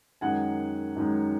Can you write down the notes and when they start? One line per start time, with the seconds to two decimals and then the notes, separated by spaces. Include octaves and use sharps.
0.21 F#2 D#3 G#3 F#5 G#5
0.96 F#2 D#3 G#3